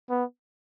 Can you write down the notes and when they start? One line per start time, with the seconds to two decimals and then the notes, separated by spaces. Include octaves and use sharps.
0.10 B3